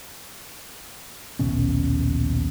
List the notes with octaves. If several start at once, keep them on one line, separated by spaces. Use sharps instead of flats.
A#1 D#2 B2 C#4